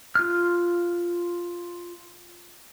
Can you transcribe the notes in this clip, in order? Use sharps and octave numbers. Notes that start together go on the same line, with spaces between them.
F4 F6